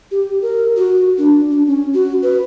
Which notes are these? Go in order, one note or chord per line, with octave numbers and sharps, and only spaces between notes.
G4
A#4
F#4
D4
D4
C#4
F#4
B4